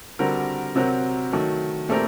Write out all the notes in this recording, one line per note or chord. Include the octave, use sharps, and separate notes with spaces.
D3 G3 C4 F#4 A#4
C3 F#3 C4 F#4 A#4
D#3 F#3 A3
A#2 A3 C4 G4 A#4